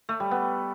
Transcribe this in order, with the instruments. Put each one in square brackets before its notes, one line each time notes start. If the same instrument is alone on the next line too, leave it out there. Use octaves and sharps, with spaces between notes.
[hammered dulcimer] A3
G3
B3